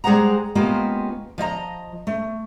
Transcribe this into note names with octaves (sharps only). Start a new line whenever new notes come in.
G3 G#3 G#4 C5 F#5 A#5
G#3 A#3 B3 C#4 F4 G4
F3 D#5 E5 A#5
A3